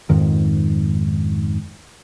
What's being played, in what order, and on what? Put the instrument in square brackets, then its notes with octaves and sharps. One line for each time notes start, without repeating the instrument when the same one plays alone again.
[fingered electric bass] F2 G#2 D#3